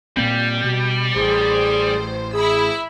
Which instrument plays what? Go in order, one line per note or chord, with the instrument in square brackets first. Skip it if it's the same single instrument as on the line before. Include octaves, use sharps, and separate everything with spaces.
[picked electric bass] A#2 A#3 C4 [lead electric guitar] G3
[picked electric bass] B2
[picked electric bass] A1 [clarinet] G#4 [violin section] C5
[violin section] E4 B5 E6 [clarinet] G#4